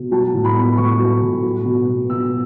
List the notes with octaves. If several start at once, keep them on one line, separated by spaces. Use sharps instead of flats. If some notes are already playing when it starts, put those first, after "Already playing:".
Already playing: B2
F#3 A5
A2
B5
B3
A2 C#6
F#3
A2
F#3
B2
B3
B2 E6